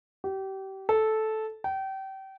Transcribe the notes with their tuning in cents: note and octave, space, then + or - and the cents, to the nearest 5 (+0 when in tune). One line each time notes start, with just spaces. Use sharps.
G4 -30
A4 -10
G5 -30